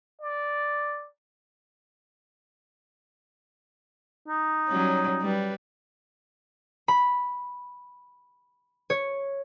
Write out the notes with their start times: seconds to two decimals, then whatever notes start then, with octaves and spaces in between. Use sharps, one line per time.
0.21 D5
4.28 D#4
4.69 F#3 G3 C#4
5.22 G3 B4
6.88 B5
8.90 C#5